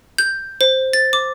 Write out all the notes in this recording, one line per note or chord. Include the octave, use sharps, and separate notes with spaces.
G6
C5
A6
D6